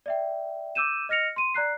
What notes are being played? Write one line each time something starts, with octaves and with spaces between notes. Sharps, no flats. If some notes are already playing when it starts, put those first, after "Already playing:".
D5 E5 G5
D6 E6 G6 D#7 E7
D#5 F6 A#6 C#7 F7
C6 D#7
D5 A#5 F#6 C7